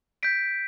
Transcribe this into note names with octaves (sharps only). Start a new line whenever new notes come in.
G6 B6 D7